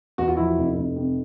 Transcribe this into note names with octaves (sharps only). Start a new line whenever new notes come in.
E2 F#4
F4
F3 E4 F#4
F1
F1
C3